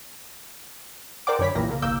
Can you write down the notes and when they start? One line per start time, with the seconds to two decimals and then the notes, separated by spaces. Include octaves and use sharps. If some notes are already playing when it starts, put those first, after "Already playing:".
1.27 A#4 C5 D5 F#5 G5 D6
1.39 F#2 D3 C#4 C#5 B5 B6
1.55 B1 A#2 E3 A#3 G4 A#6
1.69 C#3 A#3
1.82 G1 C2 A#3 D6 E6 G6